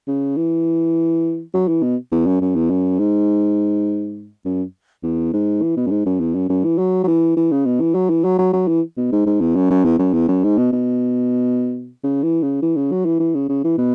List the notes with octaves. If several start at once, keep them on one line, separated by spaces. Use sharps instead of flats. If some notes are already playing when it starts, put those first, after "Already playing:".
C#3
E3
F#3
E3
B2
E2
F#2
F#2
E2
F#2
G#2
F#2
E2
G#2
E3
B2
F#2
G#2
F#2
E2
F#2
F#2
E3
F#3
F#3
E3
E3
C#3
B2
E3
F#3
E3
F#3
F#3
F#3
E3
B2
G#2
G#2
E2
F#2
F#2
E2
F#2
E2
F#2
G#2
B2
B2
C#3
E3
C#3
E3
C#3
F#3
E3
E3
C#3
C#3
E3
B2